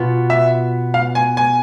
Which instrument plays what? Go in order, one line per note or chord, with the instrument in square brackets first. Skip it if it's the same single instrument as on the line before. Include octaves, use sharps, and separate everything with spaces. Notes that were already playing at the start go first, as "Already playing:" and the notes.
Already playing: [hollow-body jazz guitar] B2 B3 F4
[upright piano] E5
F5
G#5
G#5